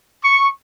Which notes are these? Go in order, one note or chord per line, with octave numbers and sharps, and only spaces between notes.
C#6